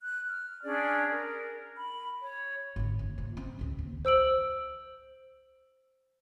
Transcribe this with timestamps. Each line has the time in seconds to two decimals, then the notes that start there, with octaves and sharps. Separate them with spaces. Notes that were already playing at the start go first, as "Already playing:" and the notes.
0.02 F#6
0.27 F6
0.63 C#4 D4 G#4 D5
1.12 A#4
1.77 B5
2.21 C#5
2.76 G#1 D3
2.99 F#1
3.18 A#2
3.37 C4
3.59 C#2 G#2
3.79 D#2
4.05 C5 E6 D7 F#7